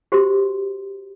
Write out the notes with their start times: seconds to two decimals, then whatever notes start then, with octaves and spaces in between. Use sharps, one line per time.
0.12 F#4 G4 C5 C6